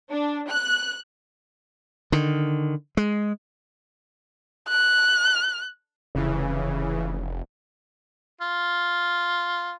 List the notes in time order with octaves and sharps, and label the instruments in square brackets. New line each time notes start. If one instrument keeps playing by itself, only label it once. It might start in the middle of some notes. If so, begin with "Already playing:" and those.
[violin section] D4
F#6
[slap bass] D3 D#3
G#3
[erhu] F#6
[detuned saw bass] F1 [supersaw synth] C#3 E3
[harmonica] F4